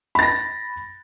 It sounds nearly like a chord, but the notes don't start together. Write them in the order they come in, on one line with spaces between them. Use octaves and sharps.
B5 A6 A#6